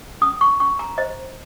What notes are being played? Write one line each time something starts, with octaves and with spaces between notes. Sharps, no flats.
C#4 D#6
C#6
C#4 C#6
A#5
C5 D#5